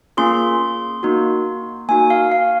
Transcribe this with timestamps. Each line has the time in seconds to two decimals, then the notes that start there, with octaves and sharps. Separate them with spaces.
0.17 A#3 C#4 F4 G#4 C6
1.03 A#3 D#4 F#4
1.89 A#3 D#4 F#4 G#5
2.10 F5
2.32 F5